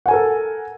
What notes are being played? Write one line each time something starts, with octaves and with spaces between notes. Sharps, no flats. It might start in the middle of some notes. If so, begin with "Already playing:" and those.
A4 A#4 F#5 G#5